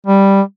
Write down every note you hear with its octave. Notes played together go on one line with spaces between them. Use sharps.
G3